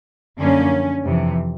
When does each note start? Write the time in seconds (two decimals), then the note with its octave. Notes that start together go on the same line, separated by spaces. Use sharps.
0.38 F#2 D3 F3 A#3 C#4
1.05 F2 C3 E3